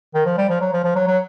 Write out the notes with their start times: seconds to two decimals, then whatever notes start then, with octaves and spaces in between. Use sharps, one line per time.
0.15 D#3
0.26 F3
0.38 G3
0.50 F3
0.61 F#3
0.73 F3
0.84 F3
0.96 F#3
1.08 F#3